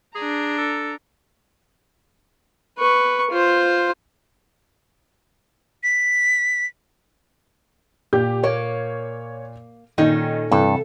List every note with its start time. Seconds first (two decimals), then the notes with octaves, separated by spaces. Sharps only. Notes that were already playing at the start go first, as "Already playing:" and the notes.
0.15 D4 G#4 A#5
0.58 A4
2.78 B4 C#6
3.31 F4 C5
5.83 B6
8.13 A#2 G4 G6
8.44 A#3 C#5
9.98 A#2 D#3 C#4 D#4 A4
10.52 G2 C3 E3 A4